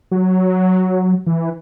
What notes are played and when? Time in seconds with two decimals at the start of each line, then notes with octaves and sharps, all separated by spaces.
0.11 F#3
1.27 E3